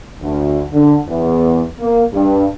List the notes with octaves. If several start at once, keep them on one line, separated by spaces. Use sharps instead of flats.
D2
D3
E2
A#3
G2